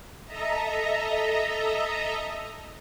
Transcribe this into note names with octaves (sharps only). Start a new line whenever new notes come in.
A4 D#5 E5 A#5